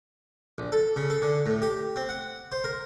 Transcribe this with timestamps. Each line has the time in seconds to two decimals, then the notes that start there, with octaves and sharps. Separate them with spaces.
0.58 A#1
0.72 A4
0.96 C#3
1.10 A4
1.22 D3
1.46 A2
1.62 G4
1.96 C4
2.09 F#5
2.52 C5
2.64 A#4